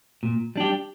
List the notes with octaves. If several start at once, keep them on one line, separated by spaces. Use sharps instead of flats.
A#2
G3 D4 G4